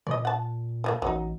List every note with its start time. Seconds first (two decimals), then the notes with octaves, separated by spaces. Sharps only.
0.07 A#2 D5 D#5
0.25 F#5 A5
0.84 F3 F#3 A#3
1.02 A1 F#3 D#4